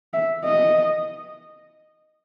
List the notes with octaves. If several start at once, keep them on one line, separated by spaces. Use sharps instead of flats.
E5
D#5